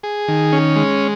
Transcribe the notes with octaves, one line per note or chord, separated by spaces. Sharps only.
G#4
D#3
C#4
G#3